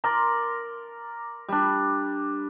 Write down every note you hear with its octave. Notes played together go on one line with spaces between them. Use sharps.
A#4 D5 A#5 C6
G3 D4